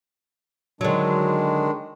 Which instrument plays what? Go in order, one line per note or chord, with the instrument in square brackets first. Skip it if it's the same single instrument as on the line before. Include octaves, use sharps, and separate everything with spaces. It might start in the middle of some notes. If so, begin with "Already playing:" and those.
[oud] D3 F#3 [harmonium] D#3 G#3 D4